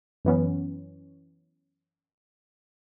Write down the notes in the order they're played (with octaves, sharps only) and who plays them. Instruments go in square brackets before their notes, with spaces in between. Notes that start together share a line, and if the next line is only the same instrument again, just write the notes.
[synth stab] F#2 E3 B3 C#4